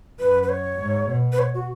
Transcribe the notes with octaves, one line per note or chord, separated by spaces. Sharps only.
F#2 B4
B4
C#5
G#2
B2
B4
C#5
F#4